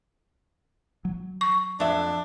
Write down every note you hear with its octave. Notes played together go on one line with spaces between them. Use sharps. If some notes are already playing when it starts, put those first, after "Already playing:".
F#3
C#6
F2 D4 E5